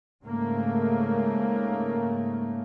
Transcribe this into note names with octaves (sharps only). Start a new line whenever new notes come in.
G#2 C#3 A3 A#3